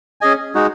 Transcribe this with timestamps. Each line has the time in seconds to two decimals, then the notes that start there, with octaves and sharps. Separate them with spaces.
0.21 C#4 G#4 D#5 G#5
0.55 G#3 D#4 F#4